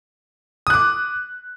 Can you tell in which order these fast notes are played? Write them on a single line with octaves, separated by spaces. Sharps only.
D#6 F#6 D6